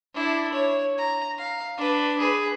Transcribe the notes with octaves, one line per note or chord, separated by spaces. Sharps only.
D4 E4
C#5
A#5
F5
D4 B4
G#4 B4